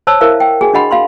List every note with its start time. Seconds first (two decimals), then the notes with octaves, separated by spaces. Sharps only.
0.07 C5 C#5 A5 E6
0.21 E4 A#4 C5 E5 F5
0.40 G5
0.61 F#4 G#4 G#5
0.73 D4 F#4 D#5 F#5 B5 C6
0.91 F#4 F5 B5 C6